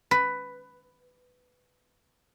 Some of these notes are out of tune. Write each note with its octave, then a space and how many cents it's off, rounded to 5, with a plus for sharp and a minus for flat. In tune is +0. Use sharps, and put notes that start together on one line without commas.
B4 +10